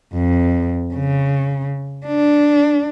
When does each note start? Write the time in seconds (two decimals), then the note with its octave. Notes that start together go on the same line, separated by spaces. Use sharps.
0.15 F2
0.94 C#3
2.07 D4